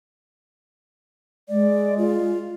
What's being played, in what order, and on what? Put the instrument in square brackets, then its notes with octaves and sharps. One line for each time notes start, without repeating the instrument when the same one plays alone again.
[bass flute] G#3 [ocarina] D5
[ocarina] F4